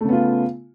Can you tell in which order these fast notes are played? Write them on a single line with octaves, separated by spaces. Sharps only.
A3 C#3 B3 F4